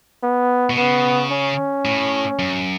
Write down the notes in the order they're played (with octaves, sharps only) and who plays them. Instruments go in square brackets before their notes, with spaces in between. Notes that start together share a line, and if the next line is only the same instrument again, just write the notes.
[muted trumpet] B3
[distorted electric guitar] B2
[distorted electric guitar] C#3 [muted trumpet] B3
[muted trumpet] C#4
[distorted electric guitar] A2
F#2